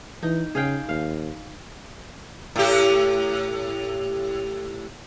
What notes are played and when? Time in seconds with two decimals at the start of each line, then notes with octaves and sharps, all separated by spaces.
0.23 E3 D#4
0.55 C#3 G#4 F5 G5
0.89 D#2 F5
2.56 A2 G4